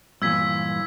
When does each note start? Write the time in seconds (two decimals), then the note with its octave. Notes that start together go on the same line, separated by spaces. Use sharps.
0.22 G2 A#2 E3 E6 G#6 B6